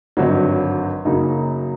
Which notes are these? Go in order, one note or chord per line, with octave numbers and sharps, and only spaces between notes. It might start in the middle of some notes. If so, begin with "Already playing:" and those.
G#1 G2 D3 F#3
F#2 C#3 F#3 A#3 D#4